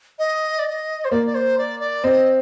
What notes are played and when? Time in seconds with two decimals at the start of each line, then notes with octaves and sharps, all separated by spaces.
0.19 D#5
0.59 D5
0.66 D#5
1.05 C5
1.11 A#3 D5
1.27 D5
1.35 C5
1.58 D5
1.80 D5
2.04 C4 D#5